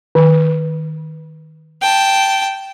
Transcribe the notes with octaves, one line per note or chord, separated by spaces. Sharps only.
D#3
G5 A5